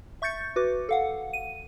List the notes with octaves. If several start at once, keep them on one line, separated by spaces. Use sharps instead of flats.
E5 C#6 G6 A6 C#7
F#4 B4 D6
A4 F5 F#5
D#7